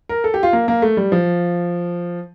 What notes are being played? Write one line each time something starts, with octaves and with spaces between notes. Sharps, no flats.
A#4
A4
G4
F4
A#3
A#3
A3
G3
F3